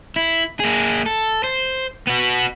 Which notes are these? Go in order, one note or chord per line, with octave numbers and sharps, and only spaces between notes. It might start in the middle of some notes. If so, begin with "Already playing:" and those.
E4
A#3 G#4
A4
C5
B3 F#4